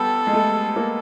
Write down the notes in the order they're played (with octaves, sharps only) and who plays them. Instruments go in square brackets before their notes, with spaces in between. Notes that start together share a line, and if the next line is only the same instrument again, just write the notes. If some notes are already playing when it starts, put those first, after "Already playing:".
Already playing: [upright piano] G3 B3 [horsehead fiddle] A4
[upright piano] G#3
A3
A#3